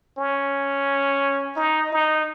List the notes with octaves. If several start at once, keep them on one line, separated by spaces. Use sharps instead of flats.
C#4
D#4
D#4